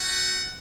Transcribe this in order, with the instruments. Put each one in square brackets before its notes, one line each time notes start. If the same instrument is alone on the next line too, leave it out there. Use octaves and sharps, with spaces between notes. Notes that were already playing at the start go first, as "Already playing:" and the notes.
Already playing: [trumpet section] A3 C#4 F#4 F#5